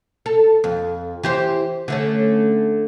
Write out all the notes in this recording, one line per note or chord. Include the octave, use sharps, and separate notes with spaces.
A4
F2
E3 G4 C5
D3 A3 C#4